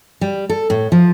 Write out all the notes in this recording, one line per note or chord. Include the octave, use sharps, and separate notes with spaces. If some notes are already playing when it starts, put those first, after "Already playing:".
G3
A4
A2
F3